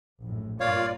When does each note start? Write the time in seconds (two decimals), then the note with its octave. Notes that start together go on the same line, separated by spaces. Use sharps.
0.22 A#1 F#2 A2
0.60 G2 A#3 F4 C#5 D5 F5